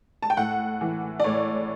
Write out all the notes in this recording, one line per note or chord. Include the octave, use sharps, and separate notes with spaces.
A5
G5
A2 F#5
E3
D5
A2 C#5